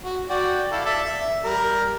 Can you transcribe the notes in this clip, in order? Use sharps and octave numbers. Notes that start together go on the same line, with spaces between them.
F#4
F#4 D5 G5
E4 A4 F5
A4 D5 E5
E5
G3 A#4